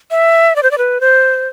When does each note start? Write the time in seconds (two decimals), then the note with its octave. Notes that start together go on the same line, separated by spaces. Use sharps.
0.11 E5
0.56 D5
0.63 C5
0.71 D5
0.78 B4
1.01 C5